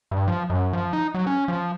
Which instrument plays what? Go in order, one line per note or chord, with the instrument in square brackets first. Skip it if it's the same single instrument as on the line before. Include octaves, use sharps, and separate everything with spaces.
[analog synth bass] G2
F3
F#2
F3
D#4
F#3
C#4
F3